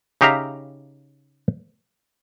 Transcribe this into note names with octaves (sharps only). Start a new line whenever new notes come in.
C#3 D#4 G4 E5 F5 A#5